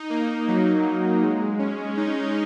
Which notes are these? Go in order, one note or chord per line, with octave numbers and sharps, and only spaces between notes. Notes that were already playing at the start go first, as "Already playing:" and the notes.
Already playing: D#4
A#3
F#3
G#3
C#4
D#4